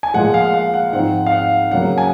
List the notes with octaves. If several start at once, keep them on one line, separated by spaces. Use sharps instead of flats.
G#5
A#2 F3 G#3 F#5
F5
F5
F#5
G#2 F3 C4 F#5
F5
F#5
C#3 F#3 A#3 C#4 F#5
G#5